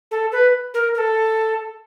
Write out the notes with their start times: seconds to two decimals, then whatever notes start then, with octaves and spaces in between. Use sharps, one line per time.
0.11 A4
0.32 B4
0.74 A#4
0.95 A#4
0.98 A4